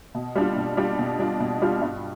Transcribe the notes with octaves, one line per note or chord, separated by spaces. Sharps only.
B2
G3 D4 F4
B2
G3 D4 F4
B2
G3 D4 F4
B2
G3 D4 F4
G2